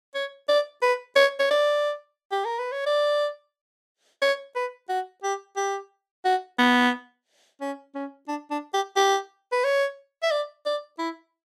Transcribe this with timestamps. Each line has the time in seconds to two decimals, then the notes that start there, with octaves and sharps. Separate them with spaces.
0.15 C#5
0.49 D5
0.82 B4
1.16 C#5
1.40 C#5
1.51 D5
2.32 G4
2.45 A#4
2.59 B4
2.72 C#5
2.86 D5
4.22 C#5
4.56 B4
4.89 F#4
5.24 G4
5.57 G4
6.25 F#4
6.59 B3
7.61 C#4
7.95 C#4
8.28 D4
8.51 D4
8.74 G4
8.96 G4
9.52 B4
9.64 C#5
10.23 E5
10.31 D5
10.66 D5
10.99 E4